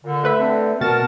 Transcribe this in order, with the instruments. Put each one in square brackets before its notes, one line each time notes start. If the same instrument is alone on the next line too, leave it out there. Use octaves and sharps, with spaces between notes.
[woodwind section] A#2 D3
[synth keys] A3 B4 E5
[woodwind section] D3 C4
[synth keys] B2 A6 [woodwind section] F#4 A#4 A5